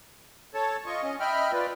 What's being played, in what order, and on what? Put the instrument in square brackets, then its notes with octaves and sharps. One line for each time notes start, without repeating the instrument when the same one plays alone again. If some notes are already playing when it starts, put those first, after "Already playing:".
[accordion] A4 C#5 A5
F4 D#5 C#6
C#4 D#5
D#5 E5 G5 B5 F6
F4 B4 D5